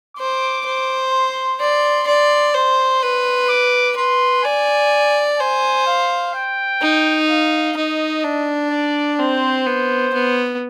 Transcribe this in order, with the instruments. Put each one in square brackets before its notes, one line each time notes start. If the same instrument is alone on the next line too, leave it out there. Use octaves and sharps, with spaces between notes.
[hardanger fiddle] C5 [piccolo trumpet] D6
[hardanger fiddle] C5
[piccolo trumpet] C6
[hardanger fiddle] D5 [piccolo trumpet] C6
[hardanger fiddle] D5 [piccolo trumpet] C6
[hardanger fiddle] C5 [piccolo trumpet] C6
[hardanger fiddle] B4 [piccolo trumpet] C6
[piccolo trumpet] D6
[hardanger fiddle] B4 [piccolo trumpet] C6
[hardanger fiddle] D5 [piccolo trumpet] G#5
[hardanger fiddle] C5 [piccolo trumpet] G#5
[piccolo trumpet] F5
G5
[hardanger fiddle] D#4
[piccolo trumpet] F5
[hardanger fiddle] D#4 [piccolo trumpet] D#5
[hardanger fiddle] D4
[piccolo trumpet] D5
[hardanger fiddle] C4 [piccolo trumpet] C5
[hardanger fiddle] B3
B3